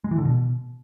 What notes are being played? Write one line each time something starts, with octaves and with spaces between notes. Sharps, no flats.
G#3
E3
D3
B2